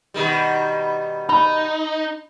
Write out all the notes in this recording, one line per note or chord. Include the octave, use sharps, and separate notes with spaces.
B2 D#3 G3
D#4 B5